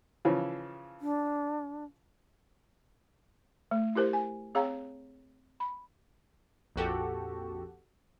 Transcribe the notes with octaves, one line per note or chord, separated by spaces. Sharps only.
C#3 E3 F3
D4
A3
E4 G4 A#4 C5
G#5
C4 G#4 C#5 F5 G5 A#5
B5
A#1 F2 F#4 G4 A4